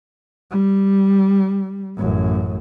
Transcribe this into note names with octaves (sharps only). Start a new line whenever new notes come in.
G3
A1 F#2